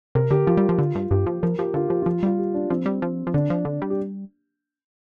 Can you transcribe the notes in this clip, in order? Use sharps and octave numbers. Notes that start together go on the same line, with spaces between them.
C3 A#4
D3 G4
F3 F4
G3
F3
D3
G2
G2 G4
F3 G4
F3 A#4
F3 G4
D3 F4
F3 G4
F3 F4
G3 F4
G4
D4
F3 C4
G3
F3
F3
D3 D4
F3
D3
G3
G4